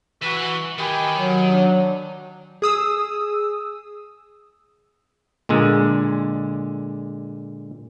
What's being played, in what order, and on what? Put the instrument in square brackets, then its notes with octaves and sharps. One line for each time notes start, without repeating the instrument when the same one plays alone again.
[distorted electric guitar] E3 E5 [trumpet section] F#4 B4 C#6
[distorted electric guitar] D#3 [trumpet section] G4 G#5 B5
[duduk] F#3
[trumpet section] D4
[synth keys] G#4 D#6 E6
[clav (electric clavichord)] A#2 D3 G#3